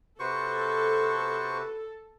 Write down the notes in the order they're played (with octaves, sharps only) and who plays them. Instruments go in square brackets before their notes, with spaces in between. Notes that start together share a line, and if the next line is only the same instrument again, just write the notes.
[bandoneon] C3 F#4 B4 [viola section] A4 [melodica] C5 C#6